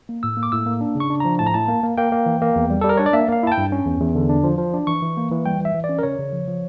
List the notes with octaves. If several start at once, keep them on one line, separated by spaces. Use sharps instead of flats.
A#3
A2 E6
A#3
D6
A2 E6
A#3
D4
C#3
C#6
D4
F3 A#5
A2 A5
A#5
A2 A5
A#3
A#3
A#3 G5
A#3
E3
A#3
E2
G3
G3 A4
A#4
D4 C#5
D5
A#3 E5
A#3 F5
E4 A5
G5
G2
C#4
E2
E2
D3
D4
F3
F3
D4
E3 C#6
E3
A#3
E3
G3 G5
E3 E5
E3
D5
C#4
A#4
C#3 C#5
C#3
F3
F3